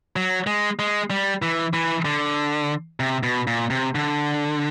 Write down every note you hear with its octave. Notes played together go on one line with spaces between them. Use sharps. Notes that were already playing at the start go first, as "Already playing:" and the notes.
F#3
G#3
G#3
G3
E3
E3
D3
C3
B2
A#2
C3
D3